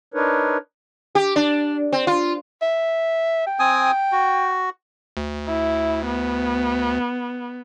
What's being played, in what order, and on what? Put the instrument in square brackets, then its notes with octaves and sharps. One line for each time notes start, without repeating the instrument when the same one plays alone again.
[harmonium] D4 D#4 A#4 B4 C#5
[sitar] G4
D4
C4
F4
[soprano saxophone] E5
G5
[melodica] C4 G#5 D#6
F#4
[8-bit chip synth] D2
[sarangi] E4
B3